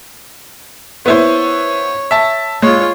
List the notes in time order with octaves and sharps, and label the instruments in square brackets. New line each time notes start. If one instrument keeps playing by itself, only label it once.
[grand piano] B3 E4 C5 [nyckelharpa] C#5
[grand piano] E5 A5
[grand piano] G#3 [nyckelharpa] F4 C#5